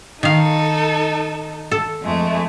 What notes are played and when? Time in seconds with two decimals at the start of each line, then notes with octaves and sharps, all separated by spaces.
0.23 D#3 D#4 A4 F5
1.71 A4
2.01 F2 G#3 A3